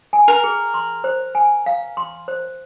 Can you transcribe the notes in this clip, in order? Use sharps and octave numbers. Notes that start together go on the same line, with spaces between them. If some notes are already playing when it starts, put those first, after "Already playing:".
G#5
A#4
G#4
C6
C5
G#5
F5
C6
C5